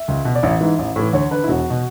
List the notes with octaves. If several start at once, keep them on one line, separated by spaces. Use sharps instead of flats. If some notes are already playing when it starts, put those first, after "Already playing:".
Already playing: E5
C#2
B2
D5
A1 E5
G#2 E3
A1
A2 E3
D2 C#5
D3 B4
E4
E1 F#4
B2